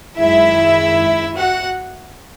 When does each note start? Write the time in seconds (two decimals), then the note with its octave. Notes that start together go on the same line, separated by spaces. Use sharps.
0.18 F#2 D#3 G#3 E4 E5
1.37 F#4 F#5